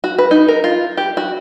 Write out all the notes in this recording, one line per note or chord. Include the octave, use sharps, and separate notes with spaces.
F#4
B4
D#4
A#4
F4
G4
F#4